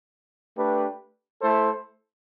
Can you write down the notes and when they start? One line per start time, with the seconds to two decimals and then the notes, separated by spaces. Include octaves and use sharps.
0.57 A3 D4 G4 B4
1.41 A3 E4 A4 C5